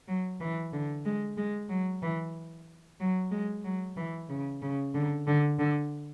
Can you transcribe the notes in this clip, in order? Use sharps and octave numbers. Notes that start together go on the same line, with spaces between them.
F#3
E3
D3
G#3
G#3
F#3
E3
F#3
G#3
F#3
E3
C#3
C#3
D3
D3
D3